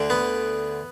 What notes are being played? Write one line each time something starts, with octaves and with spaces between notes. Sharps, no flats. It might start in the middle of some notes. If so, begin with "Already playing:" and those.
Already playing: D2 D3
B3